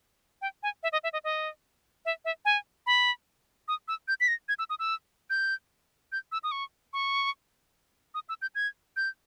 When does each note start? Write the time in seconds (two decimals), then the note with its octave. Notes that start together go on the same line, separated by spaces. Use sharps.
0.42 G5
0.63 G#5
0.83 E5
0.92 D#5
1.04 E5
1.13 D#5
1.24 D#5
2.05 E5
2.25 E5
2.45 G#5
2.86 B5
3.68 D#6
3.88 E6
4.08 G6
4.21 B6
4.28 A#6
4.49 G#6
4.59 E6
4.70 D#6
4.79 E6
5.30 G6
6.12 G6
6.32 E6
6.44 D#6
6.52 C#6
6.93 C#6
8.14 D#6
8.29 E6
8.42 G6
8.55 G#6
8.96 G6